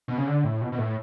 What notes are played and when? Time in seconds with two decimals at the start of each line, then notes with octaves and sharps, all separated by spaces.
0.08 B2
0.18 C#3
0.26 D3
0.44 A2
0.61 B2
0.72 B2
0.78 A2